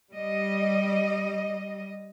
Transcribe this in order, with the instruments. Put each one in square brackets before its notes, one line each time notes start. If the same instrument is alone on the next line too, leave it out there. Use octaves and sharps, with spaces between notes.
[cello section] G3 D#5